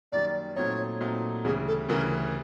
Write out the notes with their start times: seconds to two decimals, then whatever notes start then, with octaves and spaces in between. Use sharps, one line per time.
0.12 F#2 D#3 G3 A#3 D5
0.56 A#2 F#3 A3 C4 D#4 C#5
1.01 A#2 F#3 A3 C4 D#4
1.44 D2 C#3 E3 G3 G#4
1.67 A4
1.89 D2 C#3 E3 G3 A#4